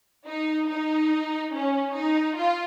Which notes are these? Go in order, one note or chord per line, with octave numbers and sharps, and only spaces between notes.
D#4
D#4
C#4
D#4
F4